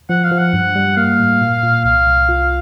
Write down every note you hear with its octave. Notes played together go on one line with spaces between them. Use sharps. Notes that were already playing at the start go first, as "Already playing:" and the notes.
F3 F#5
F5
F3
F#5
G2
G3
A#3 F5
A2
A#2
A#2
C2 F5
C2
F4